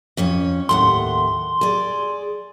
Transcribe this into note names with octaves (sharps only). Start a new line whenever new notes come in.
F2 C#4 C#5
D#2 A2 F#5 C6
G#4 D5